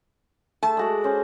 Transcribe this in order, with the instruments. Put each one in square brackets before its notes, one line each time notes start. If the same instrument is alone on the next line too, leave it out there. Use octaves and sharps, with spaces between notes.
[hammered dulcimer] A3 [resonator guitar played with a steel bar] A5
[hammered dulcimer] G#3 F#4 D5
C#4 C5